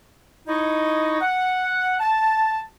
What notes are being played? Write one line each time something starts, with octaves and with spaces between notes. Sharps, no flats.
D#4 E4 C#5 D#5
F#5
A5